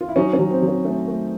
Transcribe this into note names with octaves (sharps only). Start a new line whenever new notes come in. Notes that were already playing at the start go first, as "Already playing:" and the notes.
F4
E4
F#3 C#4 D#4
C#4
F#3
C4
F#3
C#4
A3 C#4
A3